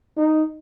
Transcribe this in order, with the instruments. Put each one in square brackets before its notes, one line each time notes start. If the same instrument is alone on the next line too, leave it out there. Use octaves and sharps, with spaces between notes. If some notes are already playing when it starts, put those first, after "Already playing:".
[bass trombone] D#4